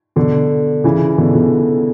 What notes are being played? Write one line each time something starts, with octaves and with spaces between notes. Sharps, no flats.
B2 D3
C#3 E3
B2 D3
B2 D3